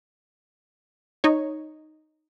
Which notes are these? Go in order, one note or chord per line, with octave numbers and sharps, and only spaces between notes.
D#4 C#5